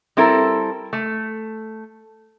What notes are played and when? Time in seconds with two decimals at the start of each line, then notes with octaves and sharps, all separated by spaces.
0.17 G3 C4 E4 A4 A#4
0.93 A3